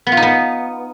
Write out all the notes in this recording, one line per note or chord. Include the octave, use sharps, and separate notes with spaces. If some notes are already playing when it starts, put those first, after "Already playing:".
B3
F4
D#4
B3